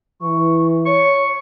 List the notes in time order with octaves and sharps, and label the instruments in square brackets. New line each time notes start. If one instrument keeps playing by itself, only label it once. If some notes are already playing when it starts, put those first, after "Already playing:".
[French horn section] E3 [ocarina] C#6
[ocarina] C#5 [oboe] C#6